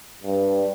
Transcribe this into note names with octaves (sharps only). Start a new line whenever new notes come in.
G2